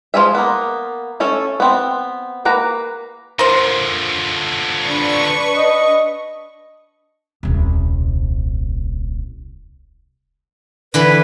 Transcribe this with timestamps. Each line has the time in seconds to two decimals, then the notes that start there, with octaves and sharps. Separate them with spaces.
0.14 F3 C4 F4 G#4 E5
0.35 A#3 B3
1.20 A3 C#4 A4
1.60 B3 C4
2.45 A#3 B4 F#5 A#5
3.39 D3 F3 A#4 C5
4.83 D4 B4 C#6
5.57 D#5
7.43 D#1 C2
10.94 D3 E3 B4 B5